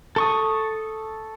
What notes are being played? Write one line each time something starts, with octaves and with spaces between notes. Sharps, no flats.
A4 C#6 D#6